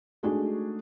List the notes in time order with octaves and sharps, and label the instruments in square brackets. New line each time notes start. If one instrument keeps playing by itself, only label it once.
[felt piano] G#3 A3 D4 D#4 F#4 G#4